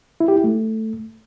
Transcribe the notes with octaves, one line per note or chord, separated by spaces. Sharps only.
E4
G4
E4
A3